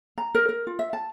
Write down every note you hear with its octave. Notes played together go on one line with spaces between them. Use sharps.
A#5
A#4
A#4
F4
E5
A5